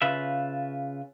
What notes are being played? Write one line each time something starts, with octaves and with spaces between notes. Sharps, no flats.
C#3 F4 B4 E5